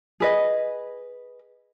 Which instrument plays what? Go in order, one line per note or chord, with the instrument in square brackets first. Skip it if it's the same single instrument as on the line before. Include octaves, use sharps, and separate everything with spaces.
[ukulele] G#4 B4 D#5